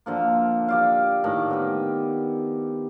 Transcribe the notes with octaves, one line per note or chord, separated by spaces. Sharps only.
D3 F3 A#3
G4 D5 F5
A2 D#3 A5
B3 G4